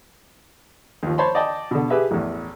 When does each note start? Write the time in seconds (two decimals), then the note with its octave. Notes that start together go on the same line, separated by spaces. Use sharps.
1.03 D#2 F3
1.18 C5 C#5 A5 B5 C6
1.35 D5 D#5 G5 A5 D6
1.71 B2 D3
1.90 G4 G#4 B4 E5
2.11 A1 E2